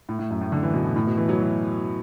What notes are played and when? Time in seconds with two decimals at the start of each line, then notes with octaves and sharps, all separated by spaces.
0.09 A2
0.19 A2
0.30 F#2
0.41 A2
0.52 D3
0.63 E3
0.74 B2
0.85 A2
0.96 A2
1.06 B2
1.17 E3
1.29 F#3
1.39 E3